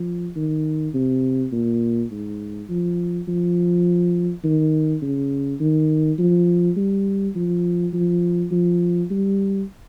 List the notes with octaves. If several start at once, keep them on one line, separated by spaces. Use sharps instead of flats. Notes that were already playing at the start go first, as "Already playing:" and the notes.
Already playing: F3
D#3
C3
A#2
G#2
F3
F3
D#3
C#3
D#3
F3
G3
F3
F3
F3
G3